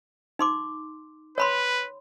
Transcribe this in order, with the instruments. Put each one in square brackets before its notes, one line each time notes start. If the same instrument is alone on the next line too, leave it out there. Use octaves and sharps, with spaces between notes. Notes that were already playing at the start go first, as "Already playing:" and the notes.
[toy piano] D#4 C6 D6
[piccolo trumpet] B4 [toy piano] C#5 B5 C6